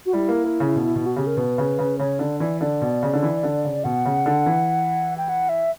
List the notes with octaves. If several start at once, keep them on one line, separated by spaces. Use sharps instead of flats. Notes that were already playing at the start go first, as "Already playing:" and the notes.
F#4
G3 E4
A#3
A#3
C#3
B2
B2
F#4
C#3 G4
A#4
B2 B4
C#3
C#3
C#3 C#5
D3 D5
E3 D5
D3 D5
B2
C#3
D3
E3
D3
C#3
B2 F#5
C#3
D3
E3
G5
F#5
E5